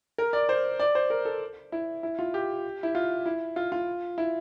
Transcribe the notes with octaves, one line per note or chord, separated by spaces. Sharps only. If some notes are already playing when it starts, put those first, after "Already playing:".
A#4
D5
C5
D5
C5
A#4
A4
E4
E4
F4
G4
E4
F4
E4
F4
F4
E4